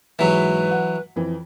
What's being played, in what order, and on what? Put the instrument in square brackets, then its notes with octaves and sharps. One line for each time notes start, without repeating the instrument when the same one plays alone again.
[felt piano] G#2 F#4 B6 [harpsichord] E3 F#3 [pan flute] B4
[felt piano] F#5
F2 E3